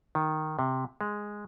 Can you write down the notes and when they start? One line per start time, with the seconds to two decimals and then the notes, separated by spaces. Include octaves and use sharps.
0.15 D#3
0.59 C3
1.01 G#3